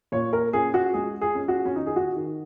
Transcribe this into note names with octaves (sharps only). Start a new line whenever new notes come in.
A#2 C#5
A#4
C#4 G#4
F#4
G#3 G#4
G#4
C#4
F#4
C#4
D#3 D#4
G#4
F#4
D#3